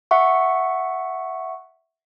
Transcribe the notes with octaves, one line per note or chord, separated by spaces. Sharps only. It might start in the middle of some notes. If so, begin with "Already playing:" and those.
E5 F#5 C#6